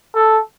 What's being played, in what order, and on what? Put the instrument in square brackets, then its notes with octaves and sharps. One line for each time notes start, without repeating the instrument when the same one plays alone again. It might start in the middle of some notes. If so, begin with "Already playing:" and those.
[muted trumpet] A4